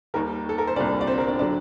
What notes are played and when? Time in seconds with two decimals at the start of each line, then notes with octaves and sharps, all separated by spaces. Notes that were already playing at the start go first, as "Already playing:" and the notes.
0.14 D#2 D#3 G3 A#4
0.49 A4
0.58 A#4
0.67 C5
0.76 C2 A#2 G3 D4 D5
1.01 D5
1.07 C4 C5
1.18 A#4
1.28 D4 D5
1.39 D3 F#3 D4 D5